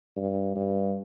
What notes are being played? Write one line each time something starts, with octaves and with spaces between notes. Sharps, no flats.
G2
G2